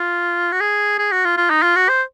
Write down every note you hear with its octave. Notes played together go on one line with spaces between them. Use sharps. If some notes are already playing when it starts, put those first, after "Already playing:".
Already playing: F4
F#4
G#4
G#4
F#4
F4
F4
D#4
F4
F#4
C5